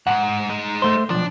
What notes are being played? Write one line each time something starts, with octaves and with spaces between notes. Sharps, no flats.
F2 G#2 F#5
G#3 D#4
A3 C5
B1 G2 F3 D4